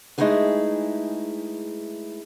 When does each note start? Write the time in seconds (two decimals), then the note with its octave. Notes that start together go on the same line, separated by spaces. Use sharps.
0.18 G#3 A3 D#4 E4 G#4 B4